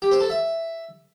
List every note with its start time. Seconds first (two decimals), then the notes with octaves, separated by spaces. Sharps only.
0.02 G4
0.11 C5
0.20 A4
0.30 E5